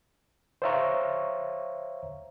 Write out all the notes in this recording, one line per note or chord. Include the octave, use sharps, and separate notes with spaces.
C5 C#5 E5 F5 A#5 C#6